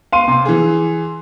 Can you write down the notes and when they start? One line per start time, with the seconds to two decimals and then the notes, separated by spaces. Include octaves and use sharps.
0.12 F5 C6 D#7
0.28 C3
0.45 E3 G#4